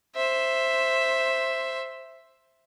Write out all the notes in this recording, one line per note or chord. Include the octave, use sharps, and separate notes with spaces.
C5 E5